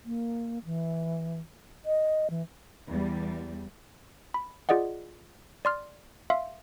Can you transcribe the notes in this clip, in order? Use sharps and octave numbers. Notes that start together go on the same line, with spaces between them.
A#3
E3
D#5
E3
E2 G3
B5
F4 G#4 D5 D#5 F#5
D5 C6 F6
E5 F5 C6